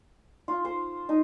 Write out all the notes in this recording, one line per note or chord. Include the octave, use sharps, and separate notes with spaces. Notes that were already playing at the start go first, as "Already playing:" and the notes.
F4
C5
D#4